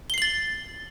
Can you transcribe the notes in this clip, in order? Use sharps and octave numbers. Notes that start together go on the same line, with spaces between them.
A6 C7 F#7 G7